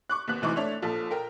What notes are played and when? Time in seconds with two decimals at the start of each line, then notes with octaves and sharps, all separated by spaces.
0.09 C#6 D6 F#6
0.27 D#2 B3 F#6
0.42 F1 D2 E3 D#4 C#6 D6
0.56 A3 D4 C#5 E5 F7
0.82 A#1 F3 A4
1.11 A#4 G5